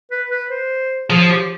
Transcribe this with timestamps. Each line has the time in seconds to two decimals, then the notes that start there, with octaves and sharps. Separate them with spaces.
0.11 B4
0.31 B4
0.50 C5
1.10 F3 G#4
1.30 G4